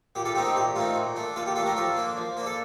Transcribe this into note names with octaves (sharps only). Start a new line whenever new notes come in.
A#2 G4
F4 A4
A3 C4 D#4 G4
G4
A#2 G4
A3 C4 D#4 F4
A#2
A3 D4
A#2 F4 A4
G4
A3 D4 F4 A4
G4 A#4
F3 F4 A4
A#3 D4
F3
A#3 D4
A4